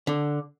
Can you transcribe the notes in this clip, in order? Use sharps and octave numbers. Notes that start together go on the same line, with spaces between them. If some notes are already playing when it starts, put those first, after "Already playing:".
D3